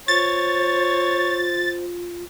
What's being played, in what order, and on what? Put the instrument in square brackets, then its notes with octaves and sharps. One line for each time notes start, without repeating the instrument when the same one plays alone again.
[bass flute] F4 [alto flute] C5 [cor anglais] C#5 [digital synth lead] A6